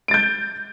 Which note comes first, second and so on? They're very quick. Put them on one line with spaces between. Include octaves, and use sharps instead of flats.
D7 A6 G6